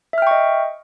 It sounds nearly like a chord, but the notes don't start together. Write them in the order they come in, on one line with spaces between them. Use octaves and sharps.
E5 F6 G5 C#6 D#5